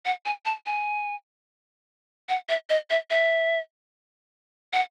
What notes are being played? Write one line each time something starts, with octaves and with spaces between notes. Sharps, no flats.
F#5
G#5
A5
G#5
F#5
E5
D#5
E5
E5
F#5